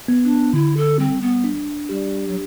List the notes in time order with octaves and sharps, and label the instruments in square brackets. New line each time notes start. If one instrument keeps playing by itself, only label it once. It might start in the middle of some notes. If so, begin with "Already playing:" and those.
[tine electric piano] B3
[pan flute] D4
[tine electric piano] D3 [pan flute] E4
[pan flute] A4
[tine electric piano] G3 [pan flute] C4
[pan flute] B3
[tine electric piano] D4
[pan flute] G3 [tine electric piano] G4
[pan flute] F#3